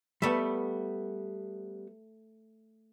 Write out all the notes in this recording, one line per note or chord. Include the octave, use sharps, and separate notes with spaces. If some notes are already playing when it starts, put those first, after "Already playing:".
G3 A3 B3 E5